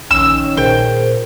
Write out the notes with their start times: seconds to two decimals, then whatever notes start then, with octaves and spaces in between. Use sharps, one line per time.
0.11 A#1 D#3 C#4 E6
0.57 A#2 G#4 A#4 C5 G5